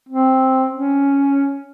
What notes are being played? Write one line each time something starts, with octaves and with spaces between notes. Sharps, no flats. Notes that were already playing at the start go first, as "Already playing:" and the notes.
C4
C#4